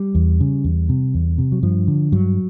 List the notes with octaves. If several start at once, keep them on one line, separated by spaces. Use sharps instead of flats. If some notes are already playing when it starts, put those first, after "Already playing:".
Already playing: G3
E2
C#3
E2
C3
E2
C3
F#3
G2 F3
D3
G2 F#3